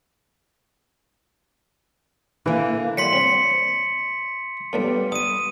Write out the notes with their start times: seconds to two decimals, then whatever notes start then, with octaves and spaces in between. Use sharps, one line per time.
2.46 D3 E3 A#3
2.97 F#3 G3 C6 B6 C#7
3.13 C#3 C4
4.73 A2 D3 G3 A#3 B3
5.12 G2 D#6 D#7